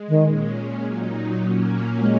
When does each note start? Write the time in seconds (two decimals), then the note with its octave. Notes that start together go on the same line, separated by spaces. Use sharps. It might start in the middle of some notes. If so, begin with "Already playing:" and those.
Already playing: G#3
0.09 D#3
0.24 A#2 G#3 C#4
0.83 A#2 F#3 D#4
1.42 A#2 F#3 A#3 C#4
2.01 G#3